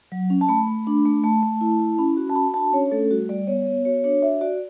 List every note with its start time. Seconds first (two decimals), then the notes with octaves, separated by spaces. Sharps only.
0.12 F#3
0.30 C#4
0.41 A5
0.49 A3 B5
0.67 A3
0.87 D4
1.06 A3
1.24 A3 A5
1.43 A3
1.61 E4
1.80 E4
1.98 C#4 B5
2.17 F#4
2.29 A5
2.35 F#4 B5
2.54 D4 A5
2.73 C#4 C#5
2.91 A3 A4
3.11 G3 F#4
3.29 G3 D5
3.47 B3 C#5
3.67 B3
3.85 F#4 C#5
4.04 D4 C#5
4.22 F#4 E5
4.41 F#4 D5